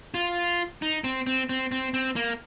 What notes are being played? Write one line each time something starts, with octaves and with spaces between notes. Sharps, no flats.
F4
D#4
C4
C4
C4
C4
C4
A#3